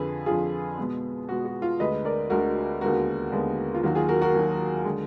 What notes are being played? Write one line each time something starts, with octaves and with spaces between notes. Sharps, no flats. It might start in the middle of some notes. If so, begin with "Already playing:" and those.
Already playing: F2 D3 F3 G#4 B4
F2 D3 F3 F4 G#4
B2 G#3 B3
B2 G#3 B3 F#4
F#4
F4
D2 D3 G#3 B4 D#5
A#4 D5
D2 D3 G#3 F#4 A#4
D#2 D3 G#3 B3 F#4 A#4
D#2 D3 G#3 B3
F4
D#2 D#3 F#3 F#4
F4 G#4
F#4 A#4
F#4 A#4
D#2 D#3 F#3
D3 G#3